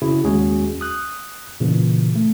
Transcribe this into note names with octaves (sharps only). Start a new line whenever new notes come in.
C#3 C#4 E4 F#4 G#4
D#2 G#3 C#4 F#4 G#4
D#6 F#6
A#2 C#3 E3
A3